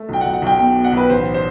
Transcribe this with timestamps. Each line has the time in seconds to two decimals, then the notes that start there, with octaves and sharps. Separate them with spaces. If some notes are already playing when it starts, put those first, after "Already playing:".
Already playing: A3
0.09 B1 G5
0.21 F#5
0.25 B1
0.33 F#5
0.42 B1 G5
0.59 B2 G5
0.76 B2
0.84 F#5
0.92 B1 B4
1.10 A1 C5
1.34 C5